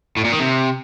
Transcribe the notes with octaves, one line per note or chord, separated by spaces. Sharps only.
A2
A#2
D#3
C3